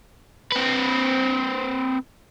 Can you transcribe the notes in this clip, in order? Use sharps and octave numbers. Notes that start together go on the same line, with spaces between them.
C4 B4